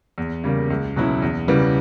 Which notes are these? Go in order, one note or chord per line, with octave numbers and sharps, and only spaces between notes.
E2
C#3 G3 A#3
C#2
B2 F#3 C#4 E4
E2
C#3 E3 G3 B3